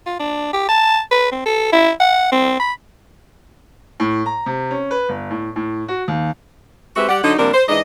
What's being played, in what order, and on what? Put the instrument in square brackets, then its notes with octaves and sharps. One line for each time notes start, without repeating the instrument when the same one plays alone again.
[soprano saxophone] F4
D4
G4
A5
B4
C4
A4
E4
F#5
C4
B5
[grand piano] A2
A#5
C3
C#4
B4
G1
A2
A2
F#4
D#2
[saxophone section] G#3 C4 F#4 G4 B4 E5
G3 G4 D5 F#5
D3 F#3 D4 D#4
C3 F3 G3 A#3 D4 A#4
C5
G#2 E3 D4 D#5